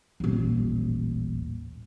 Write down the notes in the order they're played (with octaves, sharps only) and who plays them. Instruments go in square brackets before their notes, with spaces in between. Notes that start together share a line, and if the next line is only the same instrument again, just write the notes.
[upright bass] D#1 A1